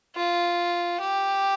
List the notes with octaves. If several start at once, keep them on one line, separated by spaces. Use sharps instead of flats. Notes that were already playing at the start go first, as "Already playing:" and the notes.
F4
G4